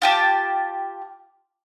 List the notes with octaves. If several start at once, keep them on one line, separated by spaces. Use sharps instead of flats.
F4 G4 A5